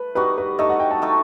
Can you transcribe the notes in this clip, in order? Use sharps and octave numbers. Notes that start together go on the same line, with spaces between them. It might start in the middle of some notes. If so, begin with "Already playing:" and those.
Already playing: A3 B4
G3 D#4 F#4 B4
B4
A3 D#4 A4 D#5
F#5
G5
A5
A3 D#4 A4